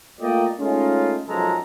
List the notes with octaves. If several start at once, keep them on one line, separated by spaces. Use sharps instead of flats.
A3 A#3 F4 D5 D#5 G5
G#3 A3 C#4 D#4 F4
B1 F#2 F3 G#3 A4 A#5